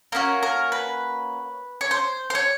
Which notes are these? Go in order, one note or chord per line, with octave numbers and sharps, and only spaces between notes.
A#3 C#4 F#4 A#4
A#4
B4
C#5
C5
C5
C#5